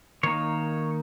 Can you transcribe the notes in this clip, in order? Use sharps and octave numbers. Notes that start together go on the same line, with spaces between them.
D#3 A#3 D#4 C#5